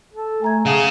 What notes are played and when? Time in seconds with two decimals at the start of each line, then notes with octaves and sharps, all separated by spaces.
0.13 A4
0.42 A3 G#5 A#5 G#6
0.66 C#3 G#4 F5 F#5 A5 D#6